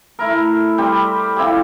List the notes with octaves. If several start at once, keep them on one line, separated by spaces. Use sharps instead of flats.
A3 E4 A#4
G3 C4 G4
F3 C4 E4 G4